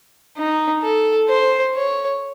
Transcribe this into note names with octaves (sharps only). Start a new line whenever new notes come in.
D#4
A4
C5
C#5